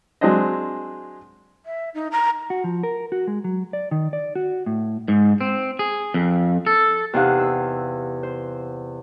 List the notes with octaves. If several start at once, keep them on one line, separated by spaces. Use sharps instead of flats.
F#3 G#3 C4 D4 D#5
E5
D#4
A#5
F#4
F3
A#4
F#4
G#3
F#3
D5
D#3
D5
F#4
A2
G#2
C4
G#4
F2
A4
E2 C3 D#4 F5 F#5 F#6
E6
C5